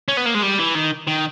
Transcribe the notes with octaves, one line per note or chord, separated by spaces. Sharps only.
C#4
B3
A#3
G#3
G3
E3
D#3
D#3